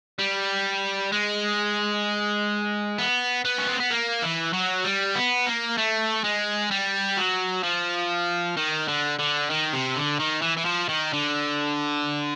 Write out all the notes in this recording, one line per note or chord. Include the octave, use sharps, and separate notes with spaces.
G3
G#3
B3
B3
C#4
C4
B3
A#3
E3
F#3
G3
B3
A#3
A3
G#3
G3
F#3
F3
D#3
D3
D3
D#3
C3
D3
D#3
E3
E3
F3
D#3
D3